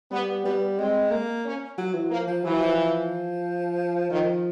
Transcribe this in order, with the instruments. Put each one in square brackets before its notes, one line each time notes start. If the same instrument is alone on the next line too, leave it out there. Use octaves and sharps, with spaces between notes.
[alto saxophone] G3 [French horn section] B3
[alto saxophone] G3 [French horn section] B3
[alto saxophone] G#3 [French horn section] C4
[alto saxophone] A#3
[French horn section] C#4
[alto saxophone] F#3
E3
[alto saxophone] F3 [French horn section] A#3
[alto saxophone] F3
[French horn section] E3 [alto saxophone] F#3
[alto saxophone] F3
[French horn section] D#3 [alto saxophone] F3